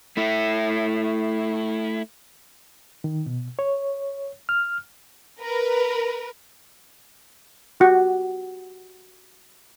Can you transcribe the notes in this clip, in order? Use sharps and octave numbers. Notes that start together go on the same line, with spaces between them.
A3 E4
D#3
B2
C#5
F6
A#4 B4
F#4 G4